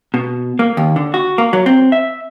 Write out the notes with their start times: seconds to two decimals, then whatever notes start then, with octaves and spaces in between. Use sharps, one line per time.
0.14 B2
0.59 A#3
0.77 D#2
0.96 D3
1.14 F#4
1.38 A#3
1.53 F#3
1.66 C4
1.92 E5